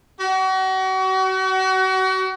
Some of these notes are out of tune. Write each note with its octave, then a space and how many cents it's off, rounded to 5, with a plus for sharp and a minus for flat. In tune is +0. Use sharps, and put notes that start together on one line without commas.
F#4 +35